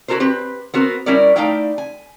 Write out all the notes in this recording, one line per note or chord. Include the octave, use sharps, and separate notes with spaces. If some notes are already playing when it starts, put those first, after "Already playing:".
E4 F#4 A4 A#4 C5
C4 G4 B4
B3 C4 F#4 A#4
G3 C#4 E4 A#4 C#5 D5
A3 D#4 E4 D5 F5 G5
G#5